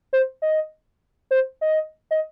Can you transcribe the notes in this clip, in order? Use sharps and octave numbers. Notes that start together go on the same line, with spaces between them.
C5
D#5
C5
D#5
D#5